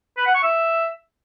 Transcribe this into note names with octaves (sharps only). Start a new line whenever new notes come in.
B4
F#5
C#6
E5